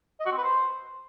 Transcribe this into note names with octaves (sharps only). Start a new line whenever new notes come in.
D#5
F#4
C4
B4
C5